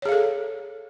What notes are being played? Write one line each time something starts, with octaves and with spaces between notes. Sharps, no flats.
G#4 A4 C#5 F5